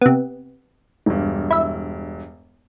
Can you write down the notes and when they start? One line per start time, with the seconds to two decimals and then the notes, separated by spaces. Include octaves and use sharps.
0.02 C3 B3
1.06 E1 G2
1.51 E4 E5